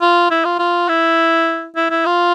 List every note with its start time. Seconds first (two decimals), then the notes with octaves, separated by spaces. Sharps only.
0.01 F4
0.31 E4
0.45 F4
0.59 F4
0.88 E4
1.76 E4
1.90 E4
2.06 F4